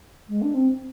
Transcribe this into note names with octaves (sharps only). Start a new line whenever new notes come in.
G#3
D4
C4